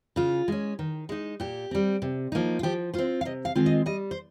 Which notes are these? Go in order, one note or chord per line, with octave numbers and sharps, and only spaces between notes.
C#3 F4
G#3 C#4
D#3
G#3 D#4
A#2 G4
G3 C4
C3
F3 A#3 D#4
F4
F3 G4
C4 F4 C5
F5
C3 D#5
F5
D#3 G#3 C4 F4
D#5
G3 D#5
C5